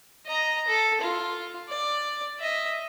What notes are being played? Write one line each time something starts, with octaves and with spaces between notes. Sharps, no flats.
D#5 A#5
A4
F4
D5
D#5 E5